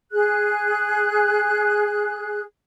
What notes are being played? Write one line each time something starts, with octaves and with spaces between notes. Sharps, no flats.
G#4 F#6